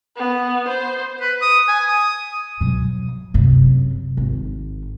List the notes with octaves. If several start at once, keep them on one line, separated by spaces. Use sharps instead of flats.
B3
C5
B4
D#6
G#5
D#6
B2 F#3
F#2 C3
G#1